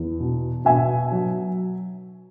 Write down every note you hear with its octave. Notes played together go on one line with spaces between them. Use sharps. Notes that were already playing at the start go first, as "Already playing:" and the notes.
Already playing: E2
B2
B2 E5 G#5
F#3